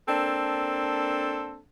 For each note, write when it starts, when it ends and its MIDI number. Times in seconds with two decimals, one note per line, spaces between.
0.08 1.60 58
0.08 1.60 60
0.08 1.60 62
0.08 1.60 69